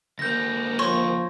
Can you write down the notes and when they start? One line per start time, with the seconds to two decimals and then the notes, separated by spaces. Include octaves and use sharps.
0.19 D2 A#3 G6 A#6
0.79 F3 C#5 C6